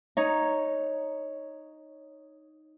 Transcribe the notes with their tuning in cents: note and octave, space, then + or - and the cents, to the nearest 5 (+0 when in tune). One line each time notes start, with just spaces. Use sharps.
D#4 +0 C#5 +0